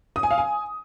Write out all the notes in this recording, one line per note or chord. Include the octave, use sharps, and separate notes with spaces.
D#6
G#5
F5
G#5